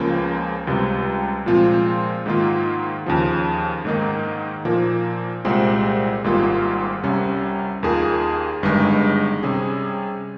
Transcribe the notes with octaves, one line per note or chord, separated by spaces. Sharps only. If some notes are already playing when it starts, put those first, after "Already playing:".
Already playing: C#2 C#3 F3 A#3
C#2 C3 G3
A#2 F3 G#3 C4 F4
G#2 D#3 A#3 F4
D#2 C#3 F3
G#2 D#3 A#3 D#4
A#2 F3 A#3
C2 A#2 G#3 C4 G4
G#1 G#2 G3 A#3 F4
C2 C3 G3 C#4
D#2 D#3 A#3 F4 G#4
G1 G2 D#3 G#3 D#4
C3 G3 C#4 G#4